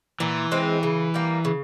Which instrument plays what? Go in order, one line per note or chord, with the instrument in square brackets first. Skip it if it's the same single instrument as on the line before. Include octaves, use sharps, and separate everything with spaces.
[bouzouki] A#2 [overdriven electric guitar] E3
[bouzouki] G#3 C4
C#3
G3 A#3
C#3